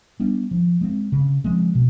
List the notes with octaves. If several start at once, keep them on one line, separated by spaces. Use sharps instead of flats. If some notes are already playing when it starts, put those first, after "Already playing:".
G3 B3 D4
F3
G#3 C4
C#3
F3 G#3 C4
B2